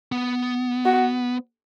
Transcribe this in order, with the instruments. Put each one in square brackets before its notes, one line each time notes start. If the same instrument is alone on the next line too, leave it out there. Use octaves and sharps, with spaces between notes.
[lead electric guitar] B3
[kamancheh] F#4